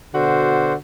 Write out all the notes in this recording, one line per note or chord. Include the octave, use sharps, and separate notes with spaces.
B2 D3 F#4 C5